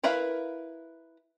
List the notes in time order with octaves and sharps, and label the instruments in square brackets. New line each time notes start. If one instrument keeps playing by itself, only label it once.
[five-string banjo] E4 A#4 B4 E5 F5